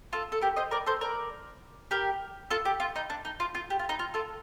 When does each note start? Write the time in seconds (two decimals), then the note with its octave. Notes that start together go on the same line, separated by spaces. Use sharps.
0.13 F4 A4
0.32 A4
0.41 G4 A#4
0.56 C5 D#5
0.71 A#4 D5
0.86 A4 C5
1.01 A#4 D5
1.91 G4 A#4
2.50 F4 A4
2.65 G4
2.80 F4
2.96 D#4
3.10 D4
3.25 D#4
3.40 F4
3.55 F4
3.70 G4
3.79 F4
3.89 D#4
3.99 F4
4.14 F4 A4